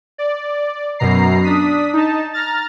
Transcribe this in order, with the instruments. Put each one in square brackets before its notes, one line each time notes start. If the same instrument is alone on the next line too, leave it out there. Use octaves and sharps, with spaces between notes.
[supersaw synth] D5
F#2 B2 A#5 C7
D4 D#6 B6
D#4 A5
A#5 F6 A6